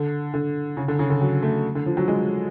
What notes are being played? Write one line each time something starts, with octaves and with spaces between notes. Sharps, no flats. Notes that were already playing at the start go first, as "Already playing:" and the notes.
Already playing: D3
D3
C#3
D3
C#3
D3
F#3
A3
D3
F3
F#3
G#3